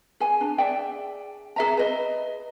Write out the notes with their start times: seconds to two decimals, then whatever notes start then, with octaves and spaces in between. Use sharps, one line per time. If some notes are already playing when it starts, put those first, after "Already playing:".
0.20 G#4 G#5
0.41 D4
0.58 G#4 D5 E5 G5
1.56 G#4 E5 A#5
1.77 B4 D#5